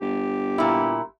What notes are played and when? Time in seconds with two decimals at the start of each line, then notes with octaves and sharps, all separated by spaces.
0.01 G1 G4
0.58 A#2 E4